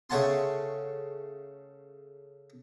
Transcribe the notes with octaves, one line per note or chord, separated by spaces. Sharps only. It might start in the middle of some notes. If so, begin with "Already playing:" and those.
C#3 A3 C#5 F#5 A5 C6